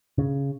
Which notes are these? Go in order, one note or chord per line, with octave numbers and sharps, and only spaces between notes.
C#3